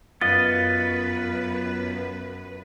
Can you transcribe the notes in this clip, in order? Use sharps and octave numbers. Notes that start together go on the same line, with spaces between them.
F#2 B3 F4 B4 D#5 A6